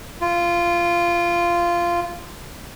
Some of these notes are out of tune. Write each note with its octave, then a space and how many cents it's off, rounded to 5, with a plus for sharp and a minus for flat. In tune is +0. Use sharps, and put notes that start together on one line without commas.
F4 -15